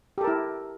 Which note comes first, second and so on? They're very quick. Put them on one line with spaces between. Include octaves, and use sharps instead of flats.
G4 A4 A#4 E4